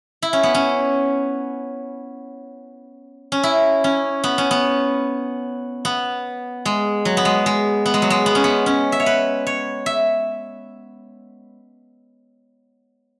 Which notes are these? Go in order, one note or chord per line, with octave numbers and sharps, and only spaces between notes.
E4
C#4
B3
C#4
C#4
E4
C#4
B3
C#4
B3
B3
G#3
F#3
B3
G#3
G#3
B3
G#3
F#3
G#3
B3
C#4
B3
C#4
E5
C#5
B4
C#5
E5